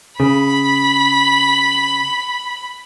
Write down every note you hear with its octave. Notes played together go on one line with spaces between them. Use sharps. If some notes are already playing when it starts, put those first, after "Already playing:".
C#3 B5